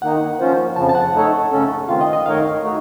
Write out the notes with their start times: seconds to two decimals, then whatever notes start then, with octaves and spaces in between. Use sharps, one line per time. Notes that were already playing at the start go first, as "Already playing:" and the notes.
0.02 D#3 A#3 D#4 F#5
0.40 F3 A#3 C#4 F4 C5
0.76 F2 C#3 F3 A5
0.89 A5
0.95 F#5
1.14 A3 D#4 A4 C#5
1.51 C#3 A3 C#4 A4
1.88 D#3 A3 C4 F4 F5
2.01 D#5
2.13 D#5
2.26 D#3 A3 D#4 A#4 C#5 F5
2.62 A3 D#4 F#4